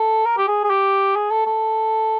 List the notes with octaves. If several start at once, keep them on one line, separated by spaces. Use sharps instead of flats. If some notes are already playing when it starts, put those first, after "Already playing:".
Already playing: A4
A#4
G4
G#4
G#4
G4
G#4
A4
A4